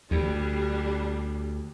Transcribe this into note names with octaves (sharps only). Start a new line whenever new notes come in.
D2 G3 D4